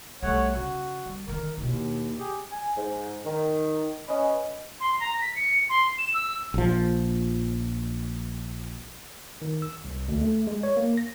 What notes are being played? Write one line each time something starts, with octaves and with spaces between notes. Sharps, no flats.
B1 G3 A3 C#5 F#5
C#3 F#4
G3
D3 D#3 A#4
D#2 B2 E4
G4 G#4
G#5
G#2
D#3
C#4 B4 D#5
C6
A#5
B6
C#7
C6
E7
E6
A#1 F3
D#3
E6
C2
D2
A3
G#3
C#5
A#3
A#6